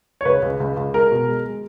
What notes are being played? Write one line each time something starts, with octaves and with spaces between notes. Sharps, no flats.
C#5
C#2 B4
C#2
C#2
C#2
G#3 A#4
B2
G#3
G#3